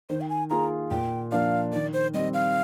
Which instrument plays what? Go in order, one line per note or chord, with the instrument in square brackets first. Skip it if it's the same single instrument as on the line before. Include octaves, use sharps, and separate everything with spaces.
[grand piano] D#3 [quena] C5
[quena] G5
G#5
[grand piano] A#3 F4 G#4 [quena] A#5
[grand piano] A#2 [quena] G5
[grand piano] F3 A#3 D4 [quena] F5
[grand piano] D#3 [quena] D5
[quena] C5
[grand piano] G3 C4 G4 [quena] D#5
[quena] F5